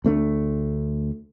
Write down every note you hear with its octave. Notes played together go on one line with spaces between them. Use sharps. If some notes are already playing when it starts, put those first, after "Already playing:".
D2 A3 B3 D4